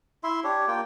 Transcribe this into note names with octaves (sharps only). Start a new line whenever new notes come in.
E4 E5 C6
D4 G4 C#5
A#3 F4 G5